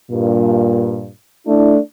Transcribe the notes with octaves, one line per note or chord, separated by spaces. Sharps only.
G2 A#2
A3 D4 E4